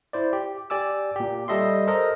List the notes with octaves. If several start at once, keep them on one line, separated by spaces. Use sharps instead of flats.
E4 C5 D5
G4
G4 D5 G#5 D6 E6
A#2 G4
G3 A4 D#5 E5 C6
A4 A#4 C5 D#5